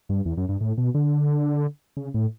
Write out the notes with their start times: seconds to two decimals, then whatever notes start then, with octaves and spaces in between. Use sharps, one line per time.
0.09 G2
0.26 E2
0.37 F#2
0.49 G2
0.61 A2
0.78 B2
0.94 D3
1.97 C#3
2.14 A2